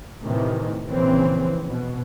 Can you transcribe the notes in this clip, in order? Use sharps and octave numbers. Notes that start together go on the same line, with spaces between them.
A2 C3 D#3 E3
A#1 C#3 E3 C4
B2